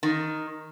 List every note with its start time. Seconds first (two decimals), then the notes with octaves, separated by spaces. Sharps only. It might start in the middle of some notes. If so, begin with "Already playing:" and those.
0.03 D#3